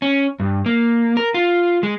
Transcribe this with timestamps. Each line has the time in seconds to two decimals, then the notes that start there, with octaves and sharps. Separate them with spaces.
0.02 C#4
0.40 G2
0.66 A#3
1.17 A#4
1.34 F4
1.83 G#3